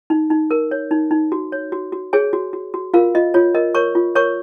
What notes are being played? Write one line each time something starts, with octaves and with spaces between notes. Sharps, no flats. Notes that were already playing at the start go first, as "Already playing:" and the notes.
D#4
D#4
A#4
C#5
D#4
D#4
F#4
C#5
F#4
F#4
G#4 C#5 G#5
F#4
F#4
F#4
F4 A#4 F5
F4 D#5
F4 C#5
A#4 D#5
A#4 C#5 C#6
F4
A#4 C#5 C#6